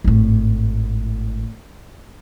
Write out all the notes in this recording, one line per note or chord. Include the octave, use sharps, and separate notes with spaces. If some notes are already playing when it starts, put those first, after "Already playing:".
G#1 A2